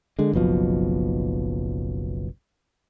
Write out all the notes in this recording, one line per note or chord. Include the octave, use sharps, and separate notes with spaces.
D3 G#3
F#1 B1 B2 F3